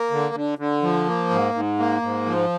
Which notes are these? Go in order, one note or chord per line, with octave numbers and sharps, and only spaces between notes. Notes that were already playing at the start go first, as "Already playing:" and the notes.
Already playing: A#3
D3
D3
D3
F3
A#3
G#2
G#2
A#3
G#2
F3